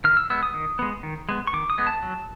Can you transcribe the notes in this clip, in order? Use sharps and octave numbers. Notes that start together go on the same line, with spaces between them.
D#3 F6
E6
G#3 B3 E6
D#6
D#3
G#3 B3
D#3
G#3 B3
C#6
D#3 D6
D#6
G#3 B3
A5
F#3